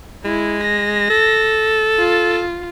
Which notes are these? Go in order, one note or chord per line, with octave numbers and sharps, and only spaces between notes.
G#3 E4
A#6
A4
F4